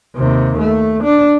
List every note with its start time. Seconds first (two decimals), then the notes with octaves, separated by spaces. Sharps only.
0.16 D#2 C3
0.59 A3
1.03 D4